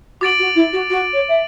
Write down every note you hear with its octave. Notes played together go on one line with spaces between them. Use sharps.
F#4 D6 A6 D7 F#7
F#4
E4
F#4
F#4
C#5
E5